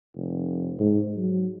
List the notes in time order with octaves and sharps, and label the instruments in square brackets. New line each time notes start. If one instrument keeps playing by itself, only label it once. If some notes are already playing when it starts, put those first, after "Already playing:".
[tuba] F1
G#2
F#3